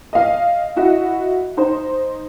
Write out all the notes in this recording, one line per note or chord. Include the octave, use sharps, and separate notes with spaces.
D#5 F5
E4 F#4 D#5
D#4 C5